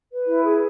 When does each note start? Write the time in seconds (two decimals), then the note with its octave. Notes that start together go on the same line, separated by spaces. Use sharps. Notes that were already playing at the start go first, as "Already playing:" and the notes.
0.10 B4
0.26 E4
0.43 G#4